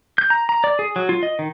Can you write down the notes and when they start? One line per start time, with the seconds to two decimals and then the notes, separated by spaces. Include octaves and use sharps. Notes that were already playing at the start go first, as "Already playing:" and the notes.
0.18 G6
0.30 A#5
0.49 A#5
0.64 D5
0.79 G#4
0.96 F#3
1.09 F4
1.23 D#5
1.39 D#3